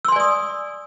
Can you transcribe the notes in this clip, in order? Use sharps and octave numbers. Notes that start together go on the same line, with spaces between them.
D5 G#5 C6 D#6 E6